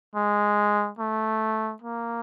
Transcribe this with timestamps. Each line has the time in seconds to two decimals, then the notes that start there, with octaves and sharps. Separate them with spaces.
0.15 G#3
0.99 A3
1.82 A#3